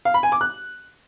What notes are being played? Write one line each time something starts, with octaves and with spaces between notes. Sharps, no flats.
F5
B5
G#5
D6
F#6